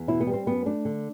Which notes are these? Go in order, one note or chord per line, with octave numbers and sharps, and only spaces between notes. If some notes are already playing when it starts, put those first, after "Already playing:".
Already playing: E2
B2 E4
B3
G3
C4
F#2 B3
A3 D4
D3